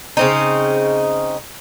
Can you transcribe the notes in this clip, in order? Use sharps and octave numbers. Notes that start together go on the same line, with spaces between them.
C#3 C4 D#4